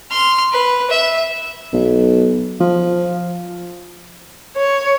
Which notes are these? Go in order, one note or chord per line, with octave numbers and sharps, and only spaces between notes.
C6 F6
B4
E5
B1
F3
C#5